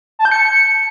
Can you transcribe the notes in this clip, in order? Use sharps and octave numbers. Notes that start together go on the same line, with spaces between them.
A5
G6
C#7